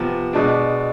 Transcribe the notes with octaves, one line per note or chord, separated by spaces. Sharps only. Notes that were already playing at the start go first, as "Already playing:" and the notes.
Already playing: C3 F3 B3
B2 G#3 D4